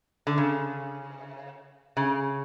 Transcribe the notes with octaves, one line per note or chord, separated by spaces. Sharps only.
D3
C#3
C#3